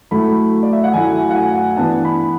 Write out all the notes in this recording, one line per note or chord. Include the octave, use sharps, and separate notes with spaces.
F#3 A3 E4 B5
D5
E5
F#5
F#3 A3 E4 G#5
F#5
G#5
E3 B3 D4 A5
B5